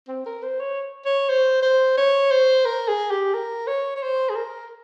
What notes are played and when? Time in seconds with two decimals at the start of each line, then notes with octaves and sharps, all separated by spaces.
0.08 C4
0.26 A#4
0.43 C5
0.60 C#5
1.06 C#5
1.29 C5
1.62 C5
1.97 C#5
2.31 C5
2.65 A#4
2.88 G#4
3.11 G4
3.34 A#4
3.68 C#5
3.97 C#5
4.03 C5
4.30 G#4
4.36 A#4